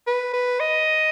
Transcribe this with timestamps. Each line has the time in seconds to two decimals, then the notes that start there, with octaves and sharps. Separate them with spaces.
0.07 B4
0.34 B4
0.60 D#5